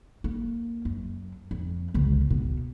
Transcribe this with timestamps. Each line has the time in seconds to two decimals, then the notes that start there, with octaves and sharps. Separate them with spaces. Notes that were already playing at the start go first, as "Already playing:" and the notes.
0.24 A#3
0.85 F#2
1.51 F2
1.94 G1 C#2
2.30 B2